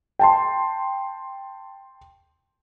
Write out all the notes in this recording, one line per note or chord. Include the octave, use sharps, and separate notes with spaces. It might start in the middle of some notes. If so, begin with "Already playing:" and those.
G5 A5 C6